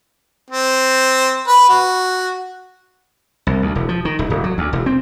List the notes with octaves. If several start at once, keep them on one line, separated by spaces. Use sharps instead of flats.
C4
B4
F#4
C2
D2
E1
F3
D#3
D#1
D1
F#3
D2
E1
C4